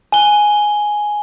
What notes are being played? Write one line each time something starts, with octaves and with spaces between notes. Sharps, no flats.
G#5 G7